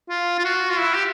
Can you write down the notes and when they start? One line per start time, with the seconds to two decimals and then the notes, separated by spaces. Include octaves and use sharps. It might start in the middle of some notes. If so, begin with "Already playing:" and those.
0.10 F4
0.39 F4
0.45 F#4
0.70 F4
0.80 E4
0.94 G4